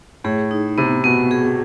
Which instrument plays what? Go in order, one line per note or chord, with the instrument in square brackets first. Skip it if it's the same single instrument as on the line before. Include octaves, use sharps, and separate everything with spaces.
[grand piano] A2 [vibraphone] G#4
[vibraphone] D#4
[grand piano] C3 [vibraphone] B3
[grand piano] B2 [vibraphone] B3
[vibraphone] G#4